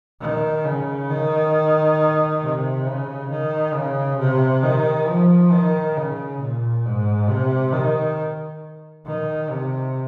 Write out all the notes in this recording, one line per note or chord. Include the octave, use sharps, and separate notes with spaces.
D#3
C#3
D#3
C3
C#3
D#3
C#3
C3
D#3
F3
D#3
C#3
A#2
G#2
C3
D#3
D#3
C3